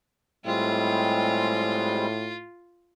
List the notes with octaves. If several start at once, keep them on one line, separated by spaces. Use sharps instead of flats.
A2 G3 G#3 C4 F4